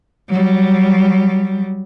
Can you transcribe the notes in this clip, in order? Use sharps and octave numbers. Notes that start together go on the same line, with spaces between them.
F#3 G3